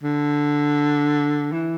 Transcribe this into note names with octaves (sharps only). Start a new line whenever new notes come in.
D3
E3